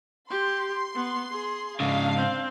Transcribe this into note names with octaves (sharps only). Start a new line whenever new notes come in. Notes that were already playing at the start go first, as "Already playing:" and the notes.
G4 C6
B3
G#4
G#2 C#3 D4 F5
C4